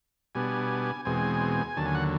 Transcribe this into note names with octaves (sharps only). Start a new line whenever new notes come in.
B2 G3 B3 D4 G#5
E2 B2 G#3 C4 G#5
D#2 D3 F#3 A5
G#5
F#5